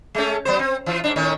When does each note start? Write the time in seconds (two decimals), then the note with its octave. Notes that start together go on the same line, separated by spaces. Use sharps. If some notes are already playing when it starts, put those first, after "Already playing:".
0.15 G#3 A3 C#4
0.45 F#3 B3 C5
0.59 C4
0.86 E3 F4
1.04 G#2 A#3 D4
1.16 A2 D#3 C#4